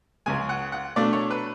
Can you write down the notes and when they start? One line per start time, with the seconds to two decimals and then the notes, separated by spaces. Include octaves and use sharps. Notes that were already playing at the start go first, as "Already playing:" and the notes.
0.26 C#2 C#3 G#3 G#5
0.49 F#5
0.72 F#5
0.96 B2 A3 D4 D5
1.13 C#5
1.30 B4